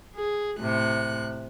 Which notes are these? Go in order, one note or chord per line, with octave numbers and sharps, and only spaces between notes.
G#4
A2 C3 F#6